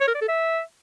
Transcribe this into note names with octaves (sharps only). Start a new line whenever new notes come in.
C#5
A#4
D5
A4
E5